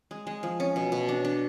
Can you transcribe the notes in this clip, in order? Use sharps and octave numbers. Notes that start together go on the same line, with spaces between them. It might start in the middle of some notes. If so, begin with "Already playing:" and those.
G#3
G#3
F3
C#4
B2
B2
D4
D4